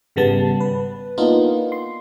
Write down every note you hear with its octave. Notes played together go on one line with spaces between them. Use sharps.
G#1 C#3 G3 B3 A5
B4
A#3 B3 D4 D#4 F4
C6